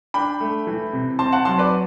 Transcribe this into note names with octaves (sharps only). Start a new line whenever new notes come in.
D4 G5 B5
A3
E3
C3
C4 A5 C6
F#5 A5
F#3 A5 C6
B4 D5